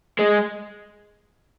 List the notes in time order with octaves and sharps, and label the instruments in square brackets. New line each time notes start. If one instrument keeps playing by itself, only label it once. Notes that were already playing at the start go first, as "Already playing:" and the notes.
[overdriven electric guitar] G#3